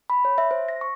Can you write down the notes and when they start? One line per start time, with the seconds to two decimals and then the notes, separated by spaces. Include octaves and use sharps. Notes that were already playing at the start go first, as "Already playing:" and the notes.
0.10 B5
0.25 C#5
0.38 E5
0.51 C5
0.68 A#6
0.81 C#6